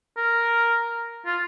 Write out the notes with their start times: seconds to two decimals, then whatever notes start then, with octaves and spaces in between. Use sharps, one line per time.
0.17 A#4
1.26 F4